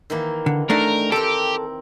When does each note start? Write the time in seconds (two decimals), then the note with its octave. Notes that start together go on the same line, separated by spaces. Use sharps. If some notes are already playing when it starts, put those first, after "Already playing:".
0.10 D#3 E3 A#3
0.46 D3
0.70 A3 D4 D#4 A#4
1.12 C4 G4 A4 A#4